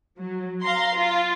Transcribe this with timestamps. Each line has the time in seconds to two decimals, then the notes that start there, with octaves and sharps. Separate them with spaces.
0.17 F#3
0.63 F5 A#5 C6
0.96 F4